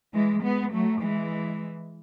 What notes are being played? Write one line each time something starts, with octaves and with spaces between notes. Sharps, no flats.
E3 G#3
G#3 B3
F#3 A3
E3 G#3